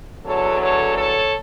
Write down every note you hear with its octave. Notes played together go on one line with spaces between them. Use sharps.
E2 D3 F#3 A4 C#5
A4 C#5
A4 C#5